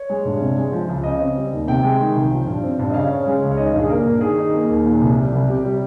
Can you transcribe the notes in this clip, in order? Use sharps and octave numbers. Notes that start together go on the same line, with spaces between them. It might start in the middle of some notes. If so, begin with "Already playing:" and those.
Already playing: C#5
G#3
G2
C3
G#3
F3
C#2
C#3 D#5
C4
G3
D#2
C3 G5
G#3
D#3
C2
F3
G2
C4
G2
D#5
C#3 F5
C#4
G#3
C#2
C#5
D#3 D#5
G2
G#4
A#3 A#4
G2
D#3 G#4
D#4
A#3
D#2
A#2
C2
G3
C2
C3 G4
G3